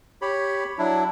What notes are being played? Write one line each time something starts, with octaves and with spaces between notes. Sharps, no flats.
G4 C#5 B5
F#3 D4 E4